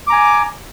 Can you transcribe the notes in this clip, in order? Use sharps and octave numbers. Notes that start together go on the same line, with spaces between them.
G#5 A#5 D6